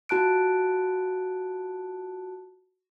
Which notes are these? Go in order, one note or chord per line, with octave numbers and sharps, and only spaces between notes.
F4 F#4 A5 F#6 D7